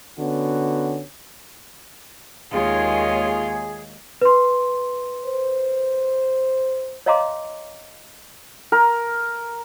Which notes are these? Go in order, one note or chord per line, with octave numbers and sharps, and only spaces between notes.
D3 B3 C#4 F#4
D#2 D#3 G#3 F4 G#4 C#5
B4 C6
C5
C#5 D#5 F5 A#5 C6 D6
A#4